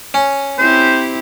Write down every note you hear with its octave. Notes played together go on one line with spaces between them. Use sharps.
C#4
C4 E4 G4 C5